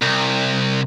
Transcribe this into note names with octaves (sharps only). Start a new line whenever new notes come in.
C2